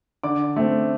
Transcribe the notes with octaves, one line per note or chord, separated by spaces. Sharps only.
D3 D5 D6
A3 C4